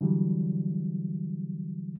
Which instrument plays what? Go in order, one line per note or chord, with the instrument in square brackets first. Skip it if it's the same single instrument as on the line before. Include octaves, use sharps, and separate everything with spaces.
[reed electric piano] D3 E3 F#3 G3